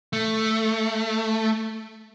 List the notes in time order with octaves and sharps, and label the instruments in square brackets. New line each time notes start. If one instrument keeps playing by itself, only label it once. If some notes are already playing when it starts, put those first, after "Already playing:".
[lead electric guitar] A3